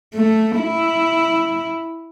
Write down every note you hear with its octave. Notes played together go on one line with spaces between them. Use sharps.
A3
E4